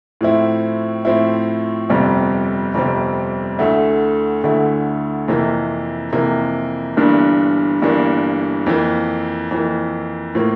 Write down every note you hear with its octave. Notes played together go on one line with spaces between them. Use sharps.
A2 F3 C4 E4
A2 F3 C4 E4
G1 F2 C3 G3 C4
G1 F2 C3 G3 C4
D2 D3 A3 E4
D2 D3 A3 E4
F2 C3 E3 A#3
F2 C3 E3 A#3
G1 G2 E3 A#3 D4
G1 G2 E3 A#3 D4
F2 E3 A#3
F2 E3 A#3
A2 F3 A#3